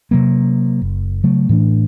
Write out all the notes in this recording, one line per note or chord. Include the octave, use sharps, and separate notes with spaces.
C3 F#3 A#3
F#1
C#3 F#3 A3
A2 E3 A3 D4